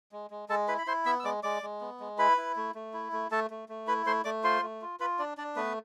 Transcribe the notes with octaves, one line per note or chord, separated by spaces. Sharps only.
G#3
G#3
G#3 A4 A5
E4 B4 B5
B5
E4 C5 C6
B3 E5 E6
E6
G#3 D5 D6
G#3 D5 D6
G#3
B3
G#3
E4 B4 B5
E4
A3
A3
E4
A3
A3 A4 A5
A3
A3
E4 B4 B5
A3 C5 C6
A3 D5 D6
F4 C5 C6
A3
F4
F4 B4 B5
D4 D5
D4 D5
A3 B3 B4